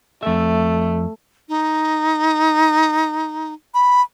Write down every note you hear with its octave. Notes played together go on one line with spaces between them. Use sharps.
F2 A3 E5
D#4
B5